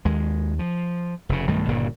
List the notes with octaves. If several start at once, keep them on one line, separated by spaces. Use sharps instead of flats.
D#2 G#3
F3
F1 G#2 C#3
B1 G2 D#3 A3
G1 G2 A#2 C#3